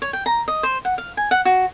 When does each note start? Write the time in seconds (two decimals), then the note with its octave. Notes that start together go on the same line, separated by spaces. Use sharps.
0.02 C#5
0.13 G5
0.26 A#5
0.48 D#5
0.63 C5
0.85 F#5
0.98 F5
1.17 G#5
1.31 F#5
1.45 F#4